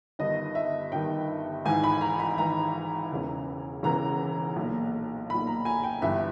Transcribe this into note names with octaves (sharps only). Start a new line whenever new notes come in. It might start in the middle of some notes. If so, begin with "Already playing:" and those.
G1 G2 D#3 D#5
E5
G1 G2 D#3 G5
G#1 G#2 E3 G#5
B5
A#5
B5
G#1 G#2 E3 A#5
E1 E2 C#3 E3
E1 E2 C#3 E3 A#5
B1 A#2
B1 A#2 B5
A#5
G#5
G5
G1 G2 E3 E5